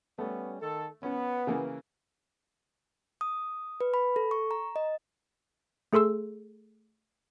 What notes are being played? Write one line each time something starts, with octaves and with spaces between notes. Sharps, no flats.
G3 A3 B3 C#4
D#3 A4
B3 C#4
C#3 E3 A#3
D#6
B4
B5
A4
C#6
A#5
D#5
A3 G#4 A4 C6 E6